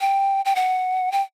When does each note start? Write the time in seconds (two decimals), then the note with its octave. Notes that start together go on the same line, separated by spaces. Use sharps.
0.01 G5
0.45 G5
0.55 F#5
1.12 G5